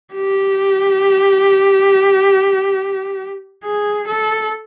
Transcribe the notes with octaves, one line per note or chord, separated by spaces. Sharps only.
G4
G#4
A4